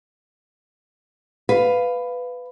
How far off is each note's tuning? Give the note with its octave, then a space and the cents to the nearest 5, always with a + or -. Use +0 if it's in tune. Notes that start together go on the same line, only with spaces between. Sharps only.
B4 +10 F5 +0